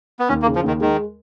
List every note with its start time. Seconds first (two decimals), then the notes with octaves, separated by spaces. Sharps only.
0.19 B3
0.29 D#2 C#4
0.42 A#3
0.46 C#3
0.56 F3
0.63 D#2 D#3
0.81 D#3 G#3